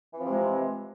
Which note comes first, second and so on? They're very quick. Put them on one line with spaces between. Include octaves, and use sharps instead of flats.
E3 C4 F3 C3 G#3